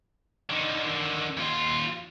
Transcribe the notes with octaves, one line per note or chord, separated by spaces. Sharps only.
D3 D#3
D#2 F4